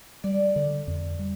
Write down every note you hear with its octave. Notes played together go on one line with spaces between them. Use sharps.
G3 D5
D3
F2
G3